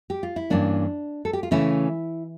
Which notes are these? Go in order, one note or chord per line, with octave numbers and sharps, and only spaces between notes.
G4
F4
E4
G2 E3 A#3 C#4 D4
A4
G4
F4
C#3 E3 A3 C#4 E4